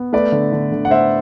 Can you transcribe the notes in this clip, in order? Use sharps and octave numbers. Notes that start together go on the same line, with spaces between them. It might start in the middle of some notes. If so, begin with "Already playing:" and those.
Already playing: B3
A3 B4 D5
D3
D3
D3
F#5
A3 C5 E5